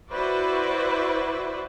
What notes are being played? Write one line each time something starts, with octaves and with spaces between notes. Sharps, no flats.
E4 F#4 B4 C5 D5